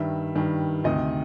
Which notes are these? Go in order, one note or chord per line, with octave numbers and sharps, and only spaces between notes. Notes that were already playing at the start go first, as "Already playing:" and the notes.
Already playing: G2 D#3 G3 E5
G2 D#3 G3
D2 C3 D#3 D#5